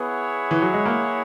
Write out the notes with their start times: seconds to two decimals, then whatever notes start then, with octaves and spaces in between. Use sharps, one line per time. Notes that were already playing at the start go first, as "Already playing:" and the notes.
Already playing: B3 E4 G#4 C#5 F#5
0.51 E3
0.62 F#3
0.74 G#3
0.85 A#3